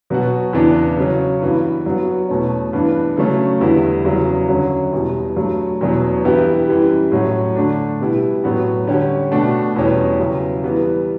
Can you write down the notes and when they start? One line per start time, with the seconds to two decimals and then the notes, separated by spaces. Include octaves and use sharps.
0.10 B2 F#3 B3 F#4
0.53 E2 C#3 E3 B3 D4
0.97 C#3 F#3 C#4
1.41 G2 E3 B3 F#4
1.86 G2 F#3 B3 F#4
2.29 E2 B2 A3 C#4
2.73 G2 E3 B3 D4
3.17 C#3 F#3 A3 C#4
3.60 E2 D3 G3 B3 E4
4.04 E2 C#3 F#3
4.48 F#2 D3 F#3 C#4
4.92 E2 B2 G3
5.36 G2 F#3 A3
5.81 E2 B2 F#3 C#4
6.24 G2 E3 B3 E4 G4
6.68 F#2 E3 G3
7.12 A2 F#3 C#4 F#4
7.55 D3 A3 D4
7.99 B2 G3 B3 E4 G4
8.44 A2 F#3 B3 F#4
8.87 D3 G3 C#4 G4
9.32 B2 A3 D4 F#4
9.76 E2 B2 G3 C#4 G4
10.19 E2 C#3 F#3
10.63 E3 G3 B3